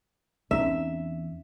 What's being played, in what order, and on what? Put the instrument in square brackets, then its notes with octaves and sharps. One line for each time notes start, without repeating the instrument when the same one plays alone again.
[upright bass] E2 [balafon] C4 C#4 D#4 [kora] E5